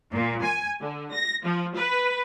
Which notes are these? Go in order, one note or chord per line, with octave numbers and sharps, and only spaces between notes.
A#2
G#5
D3
A#6
F3
B4